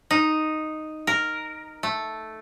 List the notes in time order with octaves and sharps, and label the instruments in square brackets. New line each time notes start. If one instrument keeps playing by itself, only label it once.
[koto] D#4
A#4
A3